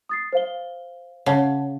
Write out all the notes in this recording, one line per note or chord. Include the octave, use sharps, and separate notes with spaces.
D#6 A6 C7
C5 F5 G7
C#3 C#5 F#5 A5